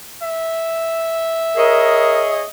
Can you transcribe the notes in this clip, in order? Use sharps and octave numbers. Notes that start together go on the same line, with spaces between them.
E5
G#4 A#4 C#5 D#5